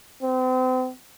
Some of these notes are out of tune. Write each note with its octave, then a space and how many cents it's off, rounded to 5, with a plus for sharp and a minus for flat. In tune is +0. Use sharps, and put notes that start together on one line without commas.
C4 -35